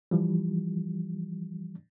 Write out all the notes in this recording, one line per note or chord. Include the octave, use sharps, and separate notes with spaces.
E3 F3 G3